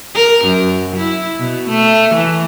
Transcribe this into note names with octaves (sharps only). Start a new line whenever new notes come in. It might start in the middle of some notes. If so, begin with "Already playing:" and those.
A#4
F#2
E4
B2
A3
E3